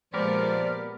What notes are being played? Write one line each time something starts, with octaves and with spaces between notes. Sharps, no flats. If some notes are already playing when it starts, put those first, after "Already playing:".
A#2 F3 G#3 B3 G4 A#4 D5 F6